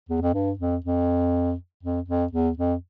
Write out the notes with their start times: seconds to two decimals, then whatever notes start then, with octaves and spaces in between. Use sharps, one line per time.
0.09 E2
0.22 F2
0.34 G2
0.59 F2
0.84 F2
1.83 F2
2.08 F2
2.32 E2
2.57 F2